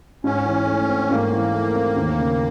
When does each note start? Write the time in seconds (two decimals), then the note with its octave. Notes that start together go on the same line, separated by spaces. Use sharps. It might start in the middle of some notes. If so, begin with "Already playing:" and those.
0.24 G#2 C#4
0.46 E3
0.67 A3
0.89 C4
1.10 G#2 A#3
1.32 E3
1.54 A3
1.75 C4
1.96 D#2
2.17 C#3